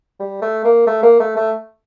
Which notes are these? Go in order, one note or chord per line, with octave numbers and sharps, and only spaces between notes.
G3
A3
A#3
A3
A#3
A3
A3